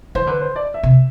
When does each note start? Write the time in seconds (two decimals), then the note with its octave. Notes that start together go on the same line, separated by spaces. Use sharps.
0.15 E3 C5
0.27 D3 B4
0.41 C5
0.56 D5
0.74 E5
0.83 C3